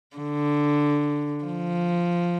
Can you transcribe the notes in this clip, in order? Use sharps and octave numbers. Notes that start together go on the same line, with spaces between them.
D3
F3